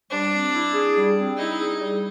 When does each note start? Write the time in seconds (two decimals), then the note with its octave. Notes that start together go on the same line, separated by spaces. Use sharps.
0.11 G3 D4
0.32 C4
0.53 E4
0.74 G#4
0.95 G3
1.16 C4
1.37 D#4 E4
1.59 G#4
1.80 G3